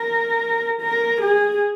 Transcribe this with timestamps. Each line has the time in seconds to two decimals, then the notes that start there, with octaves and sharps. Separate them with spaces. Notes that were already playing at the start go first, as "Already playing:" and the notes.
Already playing: A#4
0.81 A#4
1.21 G#4